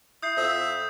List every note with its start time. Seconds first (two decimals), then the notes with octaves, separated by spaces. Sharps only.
0.23 E4 D#6 G6 C7
0.37 F2 E5